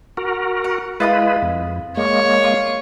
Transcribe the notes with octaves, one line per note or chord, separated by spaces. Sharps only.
F#4 A#4
F#5
G#3 E4 F4 B4 D#5 D#6
F2
G#3 A#3 C#5
F4